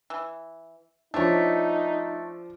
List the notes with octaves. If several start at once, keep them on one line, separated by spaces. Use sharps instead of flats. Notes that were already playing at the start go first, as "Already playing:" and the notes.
E3
F3 A3 D4 D#4 C#5